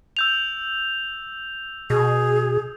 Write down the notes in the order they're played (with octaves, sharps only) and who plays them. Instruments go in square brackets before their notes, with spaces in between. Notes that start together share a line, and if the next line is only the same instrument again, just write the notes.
[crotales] E6 G6 F7
[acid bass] B2 [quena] G#4